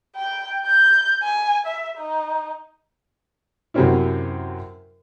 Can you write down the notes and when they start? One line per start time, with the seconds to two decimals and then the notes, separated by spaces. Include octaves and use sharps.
0.17 G5
0.66 G6
1.23 G#5
1.67 E5
1.98 D#4
3.74 F#2 C3 F#3 C4 C#4 E4